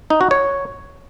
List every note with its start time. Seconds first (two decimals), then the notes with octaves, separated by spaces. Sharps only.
0.10 D#4
0.21 F#4
0.31 C#5